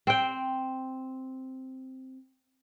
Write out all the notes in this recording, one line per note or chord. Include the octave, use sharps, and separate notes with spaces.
C4 G5